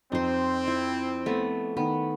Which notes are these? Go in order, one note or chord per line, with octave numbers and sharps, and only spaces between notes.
F2 C4 D#4 C5
E4
A3 B3
D#3 B3